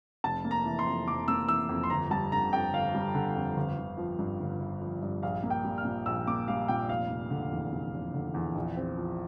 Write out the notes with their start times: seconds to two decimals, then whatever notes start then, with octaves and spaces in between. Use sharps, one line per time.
0.24 F1 A5
0.45 A#3
0.51 A#5
0.65 E3
0.79 C6
0.86 F2
1.07 F1 D6
1.28 A#3 E6
1.48 E3 E6
1.69 F2
1.84 C6
1.90 G1 A#5
2.11 G3 A5
2.32 D3 A#5
2.52 F2 G5
2.73 G1 F5
2.94 G3
3.15 D3
3.36 F2
3.57 G1
3.78 G1
3.98 F3
4.19 G2
4.40 G1
4.60 G1
4.81 F3
5.02 G2
5.23 A#1 F5
5.43 A#3
5.50 G5
5.64 G3
5.78 F6
5.85 A#2
6.06 A#1 E6
6.27 A#3 D6
6.48 G3 F5
6.68 A#2 G5
6.89 F1 F5
7.09 F1
7.30 D3
7.51 E2
7.73 F1
7.94 F1
8.14 D3
8.34 E2
8.55 A#1
8.76 C4
8.97 F3